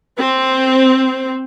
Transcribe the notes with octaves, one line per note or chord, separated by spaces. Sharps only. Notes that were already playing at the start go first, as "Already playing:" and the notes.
C4